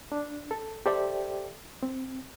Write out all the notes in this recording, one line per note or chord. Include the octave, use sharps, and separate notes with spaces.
D4
A4
G4 A4 C5 D5 E5 G5
C4